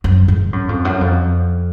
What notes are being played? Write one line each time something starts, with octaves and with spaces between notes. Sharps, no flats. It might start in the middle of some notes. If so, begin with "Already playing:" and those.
F#2
G#2
F#2
F2
F#2
F2